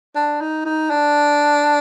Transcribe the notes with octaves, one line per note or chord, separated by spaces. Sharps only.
D4
D#4
D#4
D4